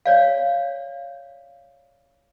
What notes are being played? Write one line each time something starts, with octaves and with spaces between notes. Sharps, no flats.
C#5 D5 F5